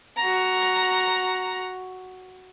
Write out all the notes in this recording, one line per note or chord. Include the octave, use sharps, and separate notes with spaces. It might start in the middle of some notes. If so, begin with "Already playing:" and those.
F#4 A#5